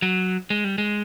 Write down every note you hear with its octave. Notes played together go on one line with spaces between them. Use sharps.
F#3
G#3
G3
G#3